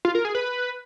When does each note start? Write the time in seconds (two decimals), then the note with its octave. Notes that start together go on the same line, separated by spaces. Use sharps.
0.05 F4
0.15 A#4
0.25 G#4
0.35 B4